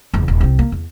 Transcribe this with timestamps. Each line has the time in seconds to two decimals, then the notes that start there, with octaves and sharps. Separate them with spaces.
0.14 F#1 E2
0.28 D#1
0.41 C2 C4
0.59 A#3
0.72 E2